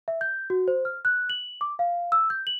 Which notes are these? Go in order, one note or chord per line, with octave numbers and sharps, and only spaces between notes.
E5
G6
F#4
C5
F6
F#6
F#7
D6
F5
E6
G6
F#7